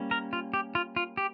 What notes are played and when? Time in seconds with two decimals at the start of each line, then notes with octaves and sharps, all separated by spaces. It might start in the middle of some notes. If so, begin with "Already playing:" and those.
Already playing: G3 A#3 C#4
0.11 A#4
0.33 F4
0.54 G4
0.75 F4
0.96 F4
1.17 G4